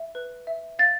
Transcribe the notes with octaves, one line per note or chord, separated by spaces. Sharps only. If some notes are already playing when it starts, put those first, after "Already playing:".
Already playing: E5
B4
E5
F5 A6